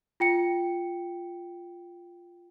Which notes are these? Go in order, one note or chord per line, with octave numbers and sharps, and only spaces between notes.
F4 G5 C#7